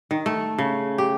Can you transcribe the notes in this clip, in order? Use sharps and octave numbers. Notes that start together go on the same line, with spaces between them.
D#3
A3
C#3
G4